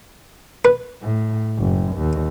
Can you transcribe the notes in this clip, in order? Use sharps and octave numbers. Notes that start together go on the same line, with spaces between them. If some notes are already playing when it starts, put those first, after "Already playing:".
B4
A2
F#1
D#2